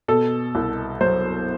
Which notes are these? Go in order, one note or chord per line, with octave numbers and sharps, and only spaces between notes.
B2 A4
C2
F#3 C5